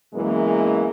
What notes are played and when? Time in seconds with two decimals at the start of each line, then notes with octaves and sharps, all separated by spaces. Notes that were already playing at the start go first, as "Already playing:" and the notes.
0.14 F#2 B2 E3 G#3 A#3